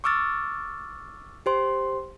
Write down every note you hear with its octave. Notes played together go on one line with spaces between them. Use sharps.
C#6 D6 E6 F6 A6
G4 C5 C6